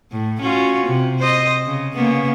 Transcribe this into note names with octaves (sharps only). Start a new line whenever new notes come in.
A2
C#4 F4 F#4
C3
C5 D#5
C#3
C#3 A#3 B3